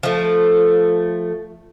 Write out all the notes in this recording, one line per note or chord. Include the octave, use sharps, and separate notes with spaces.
F3 A3